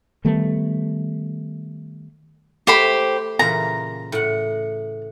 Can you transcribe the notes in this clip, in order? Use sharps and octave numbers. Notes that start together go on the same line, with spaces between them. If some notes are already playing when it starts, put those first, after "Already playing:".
D#3 G3 A3 B3
A3 G4 C5 B5
A#2 C#3 E3 A#5
A2 F#5